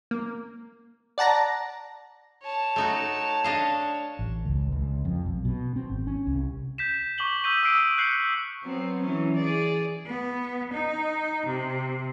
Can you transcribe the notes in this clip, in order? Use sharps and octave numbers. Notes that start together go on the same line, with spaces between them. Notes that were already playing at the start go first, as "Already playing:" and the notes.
A#3
D5 F#5 A5 A#5 A#6
C#5 A5
A3 D#4 F#4
D4 D#5 F5
A1
C#2
C#2
F2
B1
B2
C4
G#1
C#4
C2
G6 B6 E7
C#6 D6 B6 F#7 G7
C#6 D#6 E6 G6 B6 D#7
D6 E6 F6 C7 D7
F#6 G6 C7 C#7 F#7
F#3 B3 C4
E3 F#3 C#4
G#4 D5
B3
D#4
C3